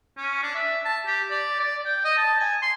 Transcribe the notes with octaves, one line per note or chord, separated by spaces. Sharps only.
C#4
D4
E5
A5
G4
D5
D5
G5
D#5
A5
G#5
C6